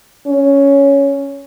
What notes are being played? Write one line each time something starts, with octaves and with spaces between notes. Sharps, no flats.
C#4